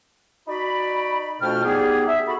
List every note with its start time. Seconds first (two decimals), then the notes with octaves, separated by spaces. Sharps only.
0.47 D#4 F#4 D5 B5
1.40 F2 B2 A3 D4 G5 F6
1.64 G3 B3 D#4 G4 G#4
2.07 E5
2.26 F#4 A4 B5